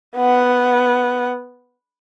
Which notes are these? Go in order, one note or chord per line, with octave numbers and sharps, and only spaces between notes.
B3 F#5